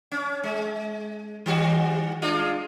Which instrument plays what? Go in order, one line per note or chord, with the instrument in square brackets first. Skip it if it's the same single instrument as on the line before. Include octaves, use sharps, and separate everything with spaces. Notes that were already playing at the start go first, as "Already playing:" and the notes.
[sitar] C#4
G#3
D#3 G3 F#4
G#3 D4 F4